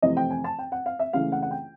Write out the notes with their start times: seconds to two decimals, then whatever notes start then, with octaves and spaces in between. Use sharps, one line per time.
0.02 F2 C3 E3 A3 D#5
0.17 G5
0.30 G#5
0.44 A5
0.59 G5
0.72 F#5
0.86 F5
0.99 E5
1.13 C#2 C#3 E3 A3 F5
1.32 F#5
1.42 F#5
1.51 G5